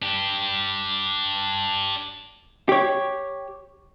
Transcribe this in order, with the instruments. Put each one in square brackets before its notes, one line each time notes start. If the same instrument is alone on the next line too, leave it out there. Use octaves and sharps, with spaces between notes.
[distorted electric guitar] D4 G4
[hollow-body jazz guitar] G4 C#5